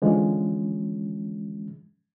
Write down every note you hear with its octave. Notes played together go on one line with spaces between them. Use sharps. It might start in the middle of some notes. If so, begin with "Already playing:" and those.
D3 E3 F3 G#3 C#4